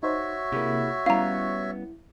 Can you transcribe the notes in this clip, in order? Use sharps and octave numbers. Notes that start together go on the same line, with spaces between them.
D#4 F#4 C5 C#5 E5
C3 A#3 E4 G4 G#4
G3 B3 C#4 E4 F5 A#5